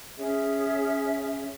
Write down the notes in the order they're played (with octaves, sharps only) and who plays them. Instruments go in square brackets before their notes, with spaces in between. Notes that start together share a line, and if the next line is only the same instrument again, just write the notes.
[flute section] C#4 G#4 C#5 E5